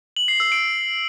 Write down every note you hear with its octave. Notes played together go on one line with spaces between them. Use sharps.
F#7
C7
E6
D7